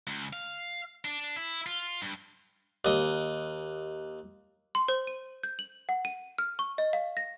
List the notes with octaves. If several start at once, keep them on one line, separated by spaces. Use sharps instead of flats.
C#2
F5
D4
E4
F4
G2
D#2 D#5
C6
C5
D#7
G6
F#7
F#5
D#7
F6
C#6
D#5
F5
A#6